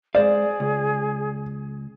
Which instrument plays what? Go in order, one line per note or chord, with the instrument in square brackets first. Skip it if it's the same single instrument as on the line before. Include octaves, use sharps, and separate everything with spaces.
[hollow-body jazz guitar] G#3 C5 F5 [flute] G#4 [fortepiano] D5
[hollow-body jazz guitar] C#2